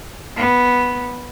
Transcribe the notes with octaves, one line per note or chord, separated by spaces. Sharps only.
B3